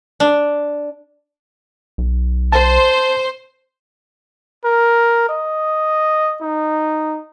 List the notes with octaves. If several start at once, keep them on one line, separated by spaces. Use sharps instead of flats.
D4
B1
C5 A5 C6
A#4
D#5
D#4